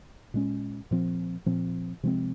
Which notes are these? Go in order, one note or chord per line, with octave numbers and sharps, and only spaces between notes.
A#2 G#3 C#4
A#2 F3 C4
A#2 F3 C4
C3 F3 G#3 C4